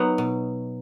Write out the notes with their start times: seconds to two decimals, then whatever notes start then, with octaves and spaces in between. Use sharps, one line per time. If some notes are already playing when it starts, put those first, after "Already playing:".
Already playing: F#3 B3 D#4
0.18 B2